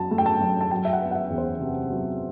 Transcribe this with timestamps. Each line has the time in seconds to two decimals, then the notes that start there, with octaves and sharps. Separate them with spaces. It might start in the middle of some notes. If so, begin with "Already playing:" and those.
Already playing: F#2 F#3 A5
0.11 A3
0.18 G5
0.26 A5
0.40 F#2
0.61 A5
0.71 F#3 G5
0.85 E5
0.93 F#5
1.01 B3
1.11 F#5
1.15 E5
1.30 E2
1.38 C5
1.60 C3
1.90 F#3